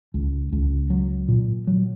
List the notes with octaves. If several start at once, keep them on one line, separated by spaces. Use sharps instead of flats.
C#2
C#2
F#3
A#2
F#3